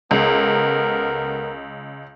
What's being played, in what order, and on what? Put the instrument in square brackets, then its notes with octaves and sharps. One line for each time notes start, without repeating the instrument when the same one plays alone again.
[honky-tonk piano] C#2 [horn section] B3 A4 A#4